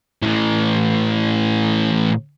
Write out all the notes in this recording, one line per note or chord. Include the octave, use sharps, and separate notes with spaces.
A2 E3